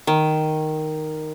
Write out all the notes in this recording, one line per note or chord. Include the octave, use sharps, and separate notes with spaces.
D#3